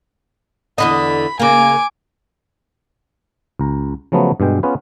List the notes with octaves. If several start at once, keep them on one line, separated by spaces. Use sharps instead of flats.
E2 D3 D#5 B5
C#3 A#3 G#5 D6
C#2 A#5
C#3 F3 F#3 A3 B3
G2 B2 G#3 G5
B3 C#4 F4 G#4 B4